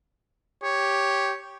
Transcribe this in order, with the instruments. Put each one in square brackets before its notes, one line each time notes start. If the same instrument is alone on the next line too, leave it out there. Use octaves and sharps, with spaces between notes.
[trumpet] G4 [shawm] C#5